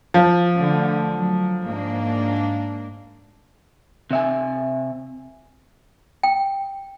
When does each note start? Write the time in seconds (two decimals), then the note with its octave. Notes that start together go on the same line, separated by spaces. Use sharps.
0.14 F3
0.57 D3 A3
1.13 F#3
1.63 G#2 A#3 D4
4.11 C3 E5 G#5
6.23 G5